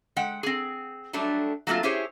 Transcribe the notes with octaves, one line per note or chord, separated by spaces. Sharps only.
G#3 F#5 G5
C4 G#4
F#3 G3 A3 D4
F#3 A3 A#3 C4 F4
C#4 E4 G4 G#4 C5 C#5